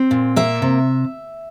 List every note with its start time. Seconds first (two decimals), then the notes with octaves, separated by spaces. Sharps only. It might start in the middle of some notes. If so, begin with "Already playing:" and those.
Already playing: C4
0.11 A#2
0.36 A#3 E5
0.62 C3